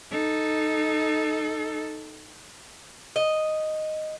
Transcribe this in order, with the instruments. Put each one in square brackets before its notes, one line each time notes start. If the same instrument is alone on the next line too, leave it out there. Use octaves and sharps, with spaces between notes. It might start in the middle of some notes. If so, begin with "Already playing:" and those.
[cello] D#4 A4
[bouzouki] D#5